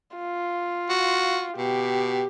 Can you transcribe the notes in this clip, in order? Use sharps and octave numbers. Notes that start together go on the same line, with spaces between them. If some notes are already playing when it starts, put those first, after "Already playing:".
F4
F#4
B2 G4